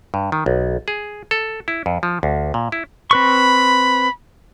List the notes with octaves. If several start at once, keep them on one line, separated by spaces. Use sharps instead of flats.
G2
D#3
B1
G#4
A4
E4
F2
F3
D2
A#2
E4
C4 B4 B5 C#6